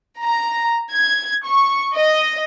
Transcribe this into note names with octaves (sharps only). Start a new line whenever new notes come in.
A#5
G#6
C#6
D#5